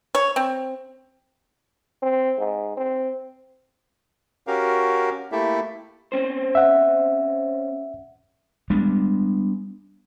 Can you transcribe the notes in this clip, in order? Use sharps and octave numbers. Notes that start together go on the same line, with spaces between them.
C#5
C4
C4
G#2
C4
C#4 F#4 G4 A#4 F5
A3 A#3 E4 G4 A4 E5
C4 C#4 C5
E5 F#5
G3 G#3 B3 D4